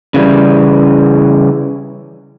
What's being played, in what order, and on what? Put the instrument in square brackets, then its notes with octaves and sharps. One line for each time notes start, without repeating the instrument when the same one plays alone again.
[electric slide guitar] C#3 E3 G3